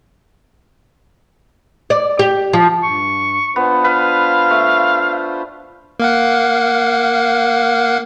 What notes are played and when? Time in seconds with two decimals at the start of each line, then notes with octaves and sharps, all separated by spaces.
1.90 D5
2.19 G4
2.53 F3
2.83 G2 C#6
3.56 B3 D4 F4 C5
3.84 B4 F5
4.51 A3
6.00 A#3 F5 F#5